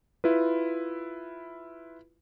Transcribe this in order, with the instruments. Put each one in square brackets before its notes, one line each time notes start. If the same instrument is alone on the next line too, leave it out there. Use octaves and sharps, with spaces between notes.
[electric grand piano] E4 F4 B4